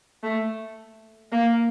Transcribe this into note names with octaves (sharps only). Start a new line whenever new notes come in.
A3
A#3